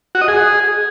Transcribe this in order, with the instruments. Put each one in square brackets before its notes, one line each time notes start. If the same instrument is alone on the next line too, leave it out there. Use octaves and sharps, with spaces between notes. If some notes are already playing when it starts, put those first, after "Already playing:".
[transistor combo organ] F#4
D#5
G#4